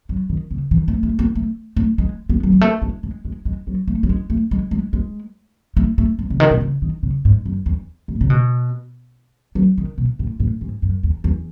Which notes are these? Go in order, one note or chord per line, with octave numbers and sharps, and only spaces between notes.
F#3
D#3
C#3
E3
A3
A3
B3
A3
A3
G#3
B3
F#3
G#3
A3
G#3
G#3
G#3
G#3
F#3
A3
F#3
G#3
A3
G#3
G#3
G#3
A3
A3
G#3
C#3
D#3
B2
C#3
D#3
C#3
G#2
F#2
E2
A2
C#3
B2
F#3
D#3
B2
A2
A2
G#2
F#2
E2
E2